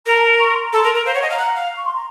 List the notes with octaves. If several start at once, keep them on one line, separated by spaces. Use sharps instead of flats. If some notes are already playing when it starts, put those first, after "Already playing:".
A#4 A#5
A5
A#5
C#6
C6
A#5
A4
C6
A#4
A#4
C5 F5
C#5 F#5
D#5 A5
F5 A#5
F#5
F5
C#6
C6
A#5